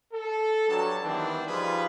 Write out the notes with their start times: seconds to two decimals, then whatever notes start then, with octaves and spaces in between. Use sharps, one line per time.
0.14 A4
0.69 G2 F#3 A5
1.04 D#3 E3 G3 B3 C4 D4
1.48 F3 G3 D#4 F4 G#4 B4